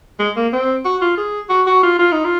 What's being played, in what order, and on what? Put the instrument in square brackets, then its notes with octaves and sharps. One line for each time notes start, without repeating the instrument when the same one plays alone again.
[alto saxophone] G#3
A#3
C4
F#4
F4
G#4
F#4
F#4
F4
F4
D#4
F4